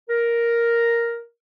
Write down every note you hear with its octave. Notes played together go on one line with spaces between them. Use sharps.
A#4